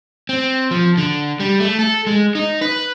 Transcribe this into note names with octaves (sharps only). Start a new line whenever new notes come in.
C4
F3
D3
G3
A3
A4
G#3
D#4
B4